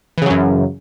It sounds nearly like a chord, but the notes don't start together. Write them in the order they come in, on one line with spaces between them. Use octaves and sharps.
E3 C#3 F#3 F#2